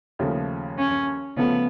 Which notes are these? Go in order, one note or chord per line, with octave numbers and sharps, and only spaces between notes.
D#2 C#3 F3 A3
C#4
C#3 F3 A3 B3